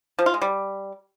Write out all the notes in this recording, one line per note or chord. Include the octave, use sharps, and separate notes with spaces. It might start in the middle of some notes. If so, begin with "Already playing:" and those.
F3
F4
G#3
G3